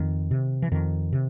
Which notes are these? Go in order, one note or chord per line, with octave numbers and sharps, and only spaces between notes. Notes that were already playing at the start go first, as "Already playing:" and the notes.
Already playing: F2 D#3
C3
E3
F2 D#3
C3